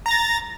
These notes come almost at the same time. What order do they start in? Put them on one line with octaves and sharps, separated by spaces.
A#5 A#6 A6